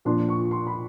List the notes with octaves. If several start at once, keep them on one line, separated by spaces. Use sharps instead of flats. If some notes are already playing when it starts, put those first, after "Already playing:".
A#2 F3 A#3 D4 C6
C#6
C6
B5